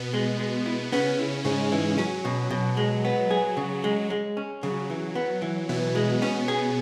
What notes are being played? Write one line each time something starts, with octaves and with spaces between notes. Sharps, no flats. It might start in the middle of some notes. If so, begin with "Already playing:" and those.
Already playing: B2 B3
G#3
G#3
E4
C#3 B3 C#4
E4
G#2 C#3 G#3
E3
F#3 C#4
B2
B2
G#3
B3
G#4
C#3
G#3
G#3
C#4
C#3 F#3
E3
B3
E3
B2 E3 B3
G#3
B2 B3 C#4
G#4